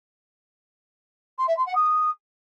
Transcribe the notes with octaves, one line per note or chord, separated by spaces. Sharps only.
C6
E5
C6
F#5
D#6